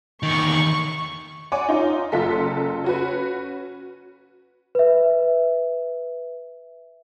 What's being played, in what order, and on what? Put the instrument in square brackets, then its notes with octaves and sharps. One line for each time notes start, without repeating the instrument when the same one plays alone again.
[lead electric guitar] E2 D#3 [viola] C#6
[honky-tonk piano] C#5 D5 F#5 G#5 D6
D#4 F4
F#1 F4 A4 B6
C#4 F#4 B4
[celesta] B4 E5